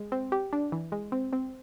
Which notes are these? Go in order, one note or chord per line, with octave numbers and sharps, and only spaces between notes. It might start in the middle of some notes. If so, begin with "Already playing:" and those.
Already playing: G#3
C4
G4
D4
E3
G#3
C4
C4